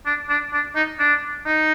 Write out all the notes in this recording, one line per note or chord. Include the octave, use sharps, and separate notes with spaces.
D4
D4
D4
D#4
D4
D#4